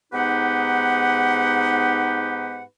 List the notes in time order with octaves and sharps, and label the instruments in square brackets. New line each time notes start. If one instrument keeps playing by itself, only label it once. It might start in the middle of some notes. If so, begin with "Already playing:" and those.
[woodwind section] G#2 B3 D#4 G4 B4 F#5